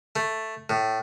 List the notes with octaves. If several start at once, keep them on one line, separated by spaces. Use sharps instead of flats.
A3
A2